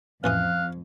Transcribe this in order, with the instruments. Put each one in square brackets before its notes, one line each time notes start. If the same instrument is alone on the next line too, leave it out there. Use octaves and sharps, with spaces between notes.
[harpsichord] A1 E3 D#6 [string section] F2 [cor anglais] F5 [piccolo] F#6